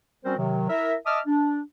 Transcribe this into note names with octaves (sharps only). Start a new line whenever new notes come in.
G3 C4 C#4 F#4 A#4 C5
C3 D#3 F#3
E4 A#4 E5
D#5 E5 A5 D6 D#6 F6
D4